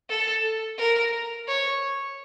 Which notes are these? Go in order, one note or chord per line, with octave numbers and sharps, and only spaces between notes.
A4
A#4
C#5